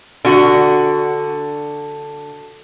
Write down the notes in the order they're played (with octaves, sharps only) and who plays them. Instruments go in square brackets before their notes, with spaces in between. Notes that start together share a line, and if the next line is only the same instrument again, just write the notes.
[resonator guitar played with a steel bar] D3 F#4